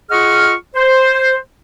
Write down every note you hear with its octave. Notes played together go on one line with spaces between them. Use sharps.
F4 G#4 D#5 F#5 C#6 F6
C5